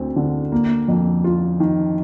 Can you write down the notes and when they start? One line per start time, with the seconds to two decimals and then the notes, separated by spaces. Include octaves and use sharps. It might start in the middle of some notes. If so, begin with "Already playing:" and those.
Already playing: D2 C4
0.16 D3
0.52 A#3
0.88 F2
1.24 F4
1.60 D#3